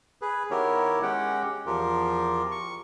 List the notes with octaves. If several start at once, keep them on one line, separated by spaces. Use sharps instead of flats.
G#4 B4
D#3 B3 E4 G4 A#4 C#5
G#3 C#4 G4 F#5 G5
E2 F3 F4 G4 A#4
C#6